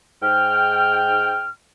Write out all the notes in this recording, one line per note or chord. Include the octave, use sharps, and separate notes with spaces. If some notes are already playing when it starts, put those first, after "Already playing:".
G#2 G5 F6